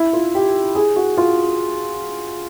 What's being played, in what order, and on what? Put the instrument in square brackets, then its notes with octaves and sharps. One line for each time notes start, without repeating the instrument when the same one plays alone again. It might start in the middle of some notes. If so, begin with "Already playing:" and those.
Already playing: [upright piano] E4
F4
G4
G#4
F#4
F4